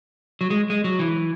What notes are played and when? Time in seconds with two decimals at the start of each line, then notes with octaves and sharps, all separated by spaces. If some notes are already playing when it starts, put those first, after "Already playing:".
0.41 F#3
0.50 G#3
0.70 G#3
0.84 F#3
0.99 E3